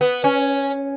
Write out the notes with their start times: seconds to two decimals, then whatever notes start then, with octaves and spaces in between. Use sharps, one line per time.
0.01 B3
0.24 C#4